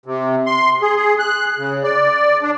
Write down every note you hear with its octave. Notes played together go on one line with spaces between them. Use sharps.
C3
C6
G#4
G#4
F#6
C#3
D5
D4